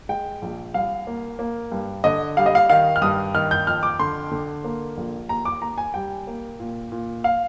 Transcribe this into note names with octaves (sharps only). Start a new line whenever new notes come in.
G#3 G5
A#1
C2 F5
A#3
A#3
G2
D3 D#5
G3 F5
D#5
F5
D#3 F5
F6
G2 D#6
D#3 F6
G6
F2 F6
D6
D3 C6
D3
A#3
A#1
D#2 A#5
D6
D#2 A#5
G#5
G3 G5
A#3
A#2
A#2
F5